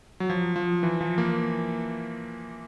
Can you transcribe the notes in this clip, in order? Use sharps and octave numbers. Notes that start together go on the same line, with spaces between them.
F#3
F3
F3
E3
F3
A#3